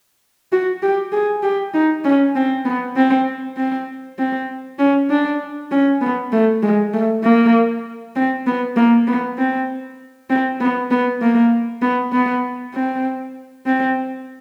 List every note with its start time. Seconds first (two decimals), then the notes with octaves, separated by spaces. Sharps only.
0.52 F#4
0.82 G4
1.12 G#4
1.43 G4
1.74 D#4
2.04 C#4
2.36 C4
2.65 B3
2.96 C4
3.57 C4
4.18 C4
4.79 C#4
5.10 D4
5.72 C#4
6.01 B3
6.32 A3
6.63 G#3
6.94 A3
7.23 A#3
8.15 C4
8.47 B3
8.76 A#3
9.07 B3
9.38 C4
10.30 C4
10.60 B3
10.91 B3
11.22 A#3
11.82 B3
12.12 B3
12.74 C4
13.66 C4